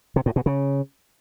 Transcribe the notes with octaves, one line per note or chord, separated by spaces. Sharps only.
C3
A2
B2
C#3